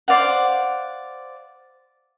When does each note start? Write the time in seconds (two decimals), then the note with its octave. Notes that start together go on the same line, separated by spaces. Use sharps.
0.08 C5 D5 F5 F#5